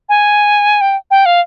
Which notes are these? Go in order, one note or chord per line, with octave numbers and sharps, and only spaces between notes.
G#5
G5
G5
F5